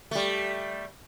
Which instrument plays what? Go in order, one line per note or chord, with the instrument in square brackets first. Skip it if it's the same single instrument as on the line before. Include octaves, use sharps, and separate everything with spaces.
[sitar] G3 A3